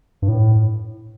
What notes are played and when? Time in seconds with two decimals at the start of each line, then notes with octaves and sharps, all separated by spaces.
0.22 G2
0.28 A2